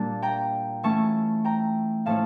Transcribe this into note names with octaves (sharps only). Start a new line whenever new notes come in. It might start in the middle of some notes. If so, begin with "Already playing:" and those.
Already playing: A#2 G3 A#3 D4 A5
G5 A#5
E3 A3 C#4 A5 C#6
G5 A#5
A2 F3 A3 C#4 F5 A5